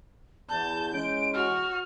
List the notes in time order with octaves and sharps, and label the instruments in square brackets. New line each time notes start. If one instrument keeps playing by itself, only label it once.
[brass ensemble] E2 [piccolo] A5 [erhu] G6
[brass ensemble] E3 G#3 C#4 [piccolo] D7
[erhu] F#4 [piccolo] F6